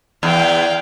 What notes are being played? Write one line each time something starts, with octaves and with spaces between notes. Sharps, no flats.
E2 F5 G5